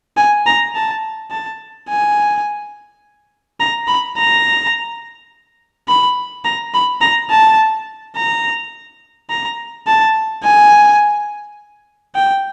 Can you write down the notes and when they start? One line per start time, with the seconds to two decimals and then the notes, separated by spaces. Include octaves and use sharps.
0.17 G#5
0.46 A#5
0.75 A5
1.31 A5
1.89 G#5
3.60 A#5
3.88 B5
4.17 A#5
5.88 B5
6.45 A#5
6.74 B5
7.01 A#5
7.31 A5
8.16 A#5
9.30 A#5
9.87 A5
10.44 G#5
12.15 G5